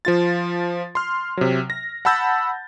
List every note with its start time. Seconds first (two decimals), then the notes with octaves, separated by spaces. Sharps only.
0.05 F3 F4 A6
0.95 C6 F6
1.37 C3 F#3
1.70 A#6
2.05 F#5 A5 B5 E6 G6 A6